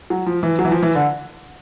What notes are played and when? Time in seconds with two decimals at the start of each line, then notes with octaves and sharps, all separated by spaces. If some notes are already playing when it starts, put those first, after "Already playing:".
0.10 F#3
0.26 F3
0.43 E3
0.59 F#3
0.65 E3
0.71 F3
0.83 E3
0.95 D3